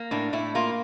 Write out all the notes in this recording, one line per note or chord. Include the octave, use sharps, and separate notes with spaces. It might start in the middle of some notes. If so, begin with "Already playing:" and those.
Already playing: A#3
A2 D4
A2 E4
A#3 F4